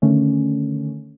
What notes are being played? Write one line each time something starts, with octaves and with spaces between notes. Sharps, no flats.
D3 D#3 A3 C#4